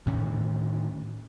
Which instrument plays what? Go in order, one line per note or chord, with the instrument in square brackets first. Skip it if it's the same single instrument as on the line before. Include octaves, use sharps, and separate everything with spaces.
[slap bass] D2 A2 D#3 C#4